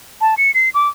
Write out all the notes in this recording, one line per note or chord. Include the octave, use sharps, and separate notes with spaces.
A5
C#7
C7
D6